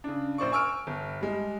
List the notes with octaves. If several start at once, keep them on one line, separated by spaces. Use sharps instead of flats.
C#3 D4
A#1 C5 D5 C#6
G#5 C#6 E6 F6 D7
G1
G3 G#3